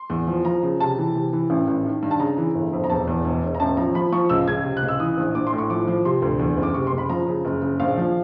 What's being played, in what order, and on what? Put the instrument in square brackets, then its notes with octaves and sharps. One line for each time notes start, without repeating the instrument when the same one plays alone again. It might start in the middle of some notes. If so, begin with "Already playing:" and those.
Already playing: [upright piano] C6
E2
F3
F3 A#5
C#3
C3 A5
E3
C3
E3
A1
A1
D#3
G2
A5
C#3 A#5
E3
G1
F2
A#5
E1 A5
E2
E1
E1
A#5
A1 A5
F3 A#5
F3 B5
F3 C#6
C#2 E6
C#2 G#6
C3
F#6
C#2
E6
E3 D#6
A#1
A#1 D6
C6
A2
C#6
F3 D6
F3
C3 C6
D2
E2
F#1
D6
C3 C#6
C6
F#1
B5
F3 A#5
C#3
F#1
C#3
A#1 F5
F3